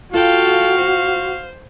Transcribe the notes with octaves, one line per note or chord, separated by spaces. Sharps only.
F4 F#4 A4 F5 G5
C5